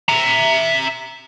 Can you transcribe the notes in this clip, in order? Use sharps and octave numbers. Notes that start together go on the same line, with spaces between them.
E5 A#5